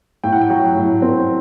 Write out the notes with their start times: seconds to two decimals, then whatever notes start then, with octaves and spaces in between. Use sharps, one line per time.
0.24 A2 G5
0.33 F#5
0.41 G5
0.50 F#3
0.76 A2
1.02 C4